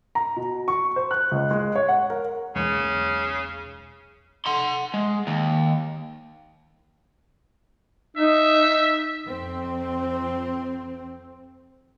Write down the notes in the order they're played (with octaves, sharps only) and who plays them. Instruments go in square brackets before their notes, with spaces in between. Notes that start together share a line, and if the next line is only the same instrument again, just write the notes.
[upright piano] A#5
B2
C#6
C5
F#6
C#2
G#3
C#5
F#5
A#4
[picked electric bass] B1 E2 G#3 [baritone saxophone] C#3
[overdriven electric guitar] F#5 C6
G#3
D#2
[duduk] D#4 [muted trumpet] E5
[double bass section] F2 C4